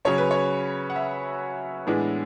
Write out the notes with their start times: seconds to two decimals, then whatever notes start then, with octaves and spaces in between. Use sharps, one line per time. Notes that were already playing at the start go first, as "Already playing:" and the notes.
0.05 C#3 F#3 C#4 C#5
0.18 B4
0.31 C#5
0.90 F#5
0.96 E5
1.87 A2 E3 G#3 B3 D4